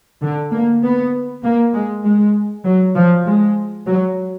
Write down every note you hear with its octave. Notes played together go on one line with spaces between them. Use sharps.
D3
A#3
B3
A#3
G#3
G#3
F#3
F3
G#3
F#3